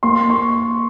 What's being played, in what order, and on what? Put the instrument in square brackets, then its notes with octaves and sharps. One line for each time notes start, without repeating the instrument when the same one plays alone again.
[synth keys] A#3 [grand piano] C6
[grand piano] C#6